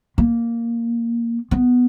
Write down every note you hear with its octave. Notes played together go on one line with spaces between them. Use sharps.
A#3
B3